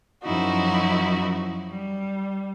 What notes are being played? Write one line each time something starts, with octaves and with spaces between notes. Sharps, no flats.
F#2 F3 D#4 E4 F#4
G3